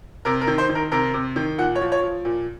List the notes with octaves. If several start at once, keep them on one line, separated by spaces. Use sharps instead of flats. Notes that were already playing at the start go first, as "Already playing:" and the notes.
C3 A#4
A#4
D#3
C5
D#3
A#4
C3 A#4
C3
D#3
A#2 F#5
C#5
F3
C#5
F3
A#2